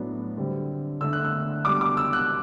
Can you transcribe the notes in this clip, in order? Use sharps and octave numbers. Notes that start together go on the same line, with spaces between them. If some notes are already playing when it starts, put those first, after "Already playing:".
Already playing: A2 F#3 B3 D4
D3 G3 C4
D3 A3 D4 E6
F#6
E6
B2 G3 D4 D6
D6
E6
F#6